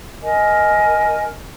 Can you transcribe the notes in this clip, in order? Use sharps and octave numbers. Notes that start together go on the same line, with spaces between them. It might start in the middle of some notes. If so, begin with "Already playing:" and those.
A#4 D#5 G#5